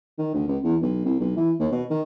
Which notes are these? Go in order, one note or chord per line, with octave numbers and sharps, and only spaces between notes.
D#3
D2
C#2
E2
B1
C2
B1
E3
D#2
B2
D#3